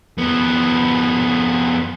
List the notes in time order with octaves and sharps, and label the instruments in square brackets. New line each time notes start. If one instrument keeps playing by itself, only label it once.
[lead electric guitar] F2 B3